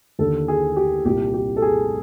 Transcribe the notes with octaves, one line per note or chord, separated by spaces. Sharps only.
D#2 D3 A4
G#4
G4
C2 A#2 G4
G4
A4
G#4